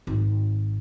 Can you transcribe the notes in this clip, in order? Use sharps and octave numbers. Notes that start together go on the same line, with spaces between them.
G#1